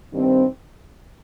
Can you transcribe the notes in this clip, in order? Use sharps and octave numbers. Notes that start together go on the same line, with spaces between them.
G2 D#3 G3 C4